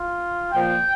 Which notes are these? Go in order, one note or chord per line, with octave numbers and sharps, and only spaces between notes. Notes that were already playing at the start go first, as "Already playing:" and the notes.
Already playing: F4
A#2 F3 G5